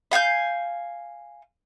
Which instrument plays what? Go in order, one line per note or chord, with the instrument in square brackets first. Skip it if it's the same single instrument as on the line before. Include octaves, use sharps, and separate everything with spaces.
[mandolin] E5 F5 G#5 G6